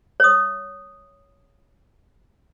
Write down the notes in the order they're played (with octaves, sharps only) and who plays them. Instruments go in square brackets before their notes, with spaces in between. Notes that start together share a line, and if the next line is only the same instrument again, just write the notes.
[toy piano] C#5 D#6